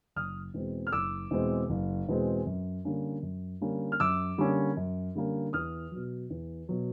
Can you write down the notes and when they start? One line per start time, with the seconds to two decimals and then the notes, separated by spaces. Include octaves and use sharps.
0.16 F#1 D#6 F6
0.54 E2 B2 G#3 C4
0.87 F6
0.92 F#1 D6 E6
1.31 E2 B2 G#3 C4
1.70 F#1
2.08 E2 B2 G#3 C4
2.47 F#2
2.85 D3 G3 A#3 C#4
3.23 F#2
3.61 D3 G3 A#3 C#4
3.92 F6
4.00 F#2 D6 E6
4.38 D3 G3 A#3 C#4
4.77 F#2
5.15 D3 G3 A#3 C#4
5.53 E2 D#6 F6
5.91 B2 F#3
6.30 E2
6.69 B2 F#3